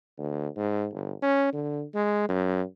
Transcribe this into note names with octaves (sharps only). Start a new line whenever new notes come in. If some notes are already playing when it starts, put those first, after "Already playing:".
D2
G#2
G1
C#4
D3
G#3
F#2